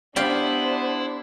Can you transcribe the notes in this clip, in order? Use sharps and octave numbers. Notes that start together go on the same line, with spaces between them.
B3 D4 E4 G4 C5 D5 F5